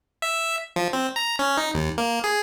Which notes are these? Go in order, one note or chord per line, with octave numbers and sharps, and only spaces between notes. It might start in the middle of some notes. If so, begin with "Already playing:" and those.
E5
F3
C4
A#5
C#4
D#4
D#2
A#3
G#4